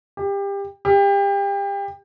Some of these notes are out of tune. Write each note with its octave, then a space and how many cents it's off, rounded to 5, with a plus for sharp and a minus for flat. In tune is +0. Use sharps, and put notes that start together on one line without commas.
G4 +25
G4 +30